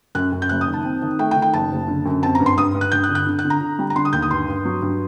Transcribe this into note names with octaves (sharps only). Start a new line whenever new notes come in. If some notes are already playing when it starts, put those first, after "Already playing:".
F#2 F#6
F#2
G6
F#1 F#6
D#6
D#3
A5
C4
D#3
A3 G5
G5
D#3
G5
F#1 A5
F#1
D3
F#2
C4 A5
A#5
G2
C6
G2 D#6
G2
F#6
G2 G6
F#6
D3
F#6
D3
F#6
D3
A#5
D3
G3
A#5
D3 C6
D#6
D#2 G6
D#6
G2 C6
G2
F#3
G2